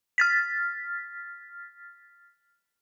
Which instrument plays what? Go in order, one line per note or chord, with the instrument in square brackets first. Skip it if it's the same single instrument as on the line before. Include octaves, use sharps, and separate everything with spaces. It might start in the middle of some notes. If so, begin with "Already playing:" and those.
[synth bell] F6 A6 B6